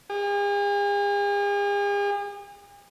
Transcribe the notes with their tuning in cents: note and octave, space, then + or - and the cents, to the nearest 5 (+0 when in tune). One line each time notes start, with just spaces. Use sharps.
G#4 -45